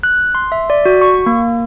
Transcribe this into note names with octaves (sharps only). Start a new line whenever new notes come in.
F#6
C6
E5
D5
F#4
C#6
A#3